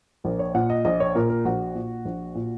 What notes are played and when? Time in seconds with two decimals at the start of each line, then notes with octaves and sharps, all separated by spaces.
0.24 A#1 A#4
0.39 C#5
0.54 A#2 F#5
0.70 D#5
0.85 A#1 D#5
1.00 C#5
1.15 A#2 A#4
1.30 A#4
1.45 A#1 F#4
1.75 A#2
2.05 A#1
2.35 A#2